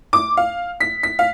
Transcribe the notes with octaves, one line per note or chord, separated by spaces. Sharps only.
D6
F5
B6
B6
F5